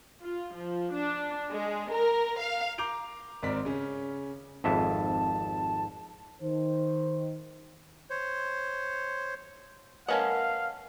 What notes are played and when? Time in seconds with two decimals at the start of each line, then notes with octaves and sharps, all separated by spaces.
0.21 F4
0.52 F3
0.93 D4
1.51 G#3
1.90 A#4
2.39 F5
2.78 A#5 D6 G6 D7 F7
3.42 G#1 G#2 C4 A#4 D5 B6
3.65 C#3 C#4
4.64 G#1 F2 E5 A5
6.42 D#3 C5
8.10 C5 C#5
10.09 A3 C#4 A#4 B4 D#5 F5 F#5